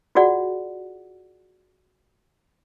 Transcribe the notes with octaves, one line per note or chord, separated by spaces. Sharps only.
F4 F#4 G#4 D5 F#5